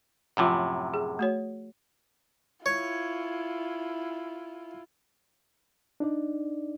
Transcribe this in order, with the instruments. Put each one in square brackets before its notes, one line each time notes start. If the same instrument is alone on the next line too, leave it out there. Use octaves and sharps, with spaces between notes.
[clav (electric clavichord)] F#2 A2 C3 [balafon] F3 F4
[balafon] G#4
A3 F#4 C#5
[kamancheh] E4 F4 [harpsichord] C#5
[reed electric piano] D4 D#4 D5